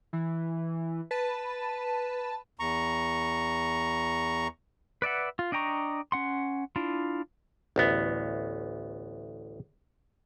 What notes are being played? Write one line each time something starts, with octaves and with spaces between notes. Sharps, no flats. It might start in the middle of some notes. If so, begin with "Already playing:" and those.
E3
B4 A5
E2 A#5 C#6
B4 D5 E5 F#5
F4
D4 D#5 G5 A#5 C#6
C#4 F#5 C6
D4 E4 F4
A1 D2 B3